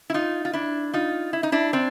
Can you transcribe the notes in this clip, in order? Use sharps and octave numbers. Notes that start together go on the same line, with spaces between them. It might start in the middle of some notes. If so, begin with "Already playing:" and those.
E4
D#4 F4
F4
D4 E4
D#4 F4
E4
D#4
D4 E4
C4 D4